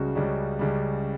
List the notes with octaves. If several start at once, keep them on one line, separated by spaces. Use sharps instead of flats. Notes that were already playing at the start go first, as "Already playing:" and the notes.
Already playing: C#2 C#3 G3 F#4
C#2 C#3 G3
C#2 C#3 G3